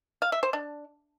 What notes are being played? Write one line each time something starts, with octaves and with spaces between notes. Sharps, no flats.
F5
E5
C5
D4